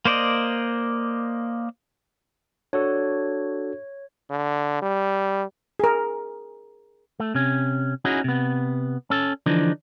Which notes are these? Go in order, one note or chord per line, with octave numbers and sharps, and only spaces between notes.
A#3 C5 D5 D#5
D4 F#4 A4 C#5
D3
G3
G#4 A#4
A3
C3 C#4
C#4 D#4 E4 F#4 G#4
C3 B3
C#4 A4
D3 E3 F3 D4 D#4